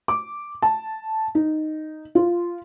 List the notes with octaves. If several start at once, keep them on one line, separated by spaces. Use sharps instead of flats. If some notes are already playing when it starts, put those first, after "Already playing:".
D6
A5
D#4
F4